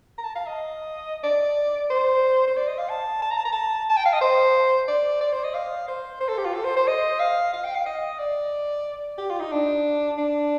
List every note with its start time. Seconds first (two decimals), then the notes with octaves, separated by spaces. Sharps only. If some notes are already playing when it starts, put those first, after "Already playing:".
0.18 A#5
0.24 A5
0.35 F5
0.46 D#5
1.23 D5
1.90 C5
2.47 C5
2.57 D5
2.68 D#5
2.78 F5
2.89 A5
3.22 A5
3.31 A#5
3.37 A5
3.45 A#5
3.52 A5
3.89 A5
3.97 G5
4.05 F5
4.13 D#5
4.21 C5
4.88 D5
5.21 D5
5.33 C5
5.44 D#5
5.54 F5
5.88 C5
6.20 C5
6.29 A4
6.38 G4
6.45 F4
6.54 A4
6.65 C5
6.76 C5
6.88 D#5
7.20 F5
7.53 F5
7.64 G5
7.75 F5
7.86 D#5
8.19 D5
9.18 G4
9.30 F4
9.40 D#4
9.52 D4
10.18 D4